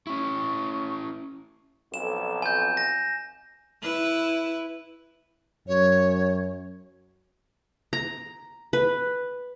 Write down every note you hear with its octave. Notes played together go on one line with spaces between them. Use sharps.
C#4 E4 C#6
B1 F2 E7
G#5 G6
A#6
E4 B4
F#2 C#5
A#5
B4